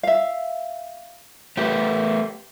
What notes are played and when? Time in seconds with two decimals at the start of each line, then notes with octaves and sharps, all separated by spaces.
0.03 E5 F5
1.57 A3 G4 A#4 B4